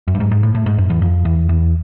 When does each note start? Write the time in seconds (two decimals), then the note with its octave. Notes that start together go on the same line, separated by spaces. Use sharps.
0.08 F#2
0.15 G2
0.20 G#2
0.31 G#2
0.43 A2
0.55 A2
0.66 G#2
0.78 F#2
0.90 E2
1.02 F2
1.25 E2
1.49 E2